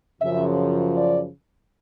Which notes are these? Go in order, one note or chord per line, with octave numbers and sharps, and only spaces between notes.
F#2 C#3 F3 E5
D5